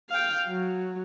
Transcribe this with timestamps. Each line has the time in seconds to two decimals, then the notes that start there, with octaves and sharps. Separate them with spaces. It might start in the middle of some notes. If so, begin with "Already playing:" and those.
0.10 F5 G5
0.47 F#3